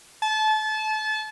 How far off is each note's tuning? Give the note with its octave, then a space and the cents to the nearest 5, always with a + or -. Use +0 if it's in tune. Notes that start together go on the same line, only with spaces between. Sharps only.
A5 -30